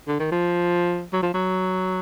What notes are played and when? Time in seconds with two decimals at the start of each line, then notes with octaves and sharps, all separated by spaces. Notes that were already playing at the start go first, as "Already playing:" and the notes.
0.08 D3
0.20 D#3
0.32 F3
1.13 F#3
1.23 F3
1.34 F#3